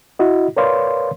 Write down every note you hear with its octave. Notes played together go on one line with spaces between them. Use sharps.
E4 F#4 D#5
A#4 B4 C#5 D5 F5 C6